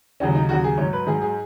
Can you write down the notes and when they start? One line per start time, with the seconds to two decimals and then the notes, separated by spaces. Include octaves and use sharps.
0.20 D#2 C#3 F#3 C#4
0.35 D#4
0.49 D#2 C#3 F#3 F#4
0.64 G#4
0.78 G#2 F#3 C#5
0.93 B4
1.07 G#2 F#3 G#4
1.22 G#4